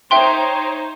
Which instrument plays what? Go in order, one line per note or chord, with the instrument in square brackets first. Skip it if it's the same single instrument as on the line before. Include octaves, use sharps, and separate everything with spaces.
[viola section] D#4 C5 C#5 [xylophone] E5 G5 C6